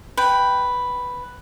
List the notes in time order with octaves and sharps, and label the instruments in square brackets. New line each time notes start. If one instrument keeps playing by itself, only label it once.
[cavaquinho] B4 G5